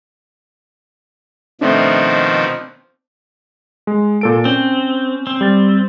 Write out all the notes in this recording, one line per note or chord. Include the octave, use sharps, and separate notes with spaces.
B2 D#3 F3 A3 C4 D4
G#3
A#2 A4 D7
C4 C#4
C4
G3 A6